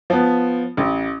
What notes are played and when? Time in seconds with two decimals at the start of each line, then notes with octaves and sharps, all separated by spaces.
0.10 F3 B3
0.77 A1